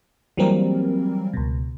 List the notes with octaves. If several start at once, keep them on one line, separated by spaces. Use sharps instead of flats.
E3 F#3 G3 A#3 C4 A#4
C#2 B2